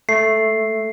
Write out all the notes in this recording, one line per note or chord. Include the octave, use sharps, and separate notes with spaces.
A3 C7